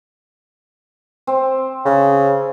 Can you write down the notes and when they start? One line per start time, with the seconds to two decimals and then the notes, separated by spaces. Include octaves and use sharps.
1.27 C4
1.85 C#3